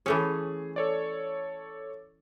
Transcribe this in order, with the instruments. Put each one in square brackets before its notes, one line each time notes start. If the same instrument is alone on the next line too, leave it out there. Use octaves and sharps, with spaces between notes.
[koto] E3 A3 C#4 [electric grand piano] G#4
[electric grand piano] A4 C#5 D5